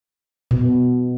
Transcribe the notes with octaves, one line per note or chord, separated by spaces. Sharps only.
B2